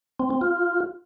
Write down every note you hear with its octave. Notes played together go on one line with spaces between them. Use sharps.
C4
C4
F4